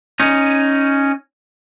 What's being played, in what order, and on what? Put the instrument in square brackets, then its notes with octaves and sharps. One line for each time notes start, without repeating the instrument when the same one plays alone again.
[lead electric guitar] C#4 D#4